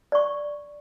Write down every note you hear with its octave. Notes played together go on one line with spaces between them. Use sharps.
D5 C#6